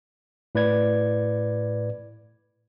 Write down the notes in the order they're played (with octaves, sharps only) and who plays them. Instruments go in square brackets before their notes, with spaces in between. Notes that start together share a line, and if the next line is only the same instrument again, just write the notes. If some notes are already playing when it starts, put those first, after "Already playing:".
[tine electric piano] A2 B4 D5 G#6